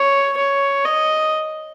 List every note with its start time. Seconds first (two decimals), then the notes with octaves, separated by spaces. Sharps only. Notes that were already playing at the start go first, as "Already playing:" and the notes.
Already playing: C#5
0.37 C#5
0.85 D#5